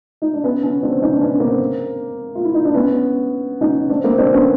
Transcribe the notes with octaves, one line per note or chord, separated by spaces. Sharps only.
D#4
D4
B3 C#4
B3 C#4
C4 D4
C#4 D#4
D4
B3 C#4
A#3 C4
F4
E4
D#4
D4
B3 C#4
C#4 D#4
C4 D4
A#3 C4
C4 D4
B3 C#4